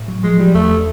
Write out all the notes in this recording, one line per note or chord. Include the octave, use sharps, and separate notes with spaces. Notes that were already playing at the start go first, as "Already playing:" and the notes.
Already playing: A2
F#3
F3 G#3
F3 G3
E2 A3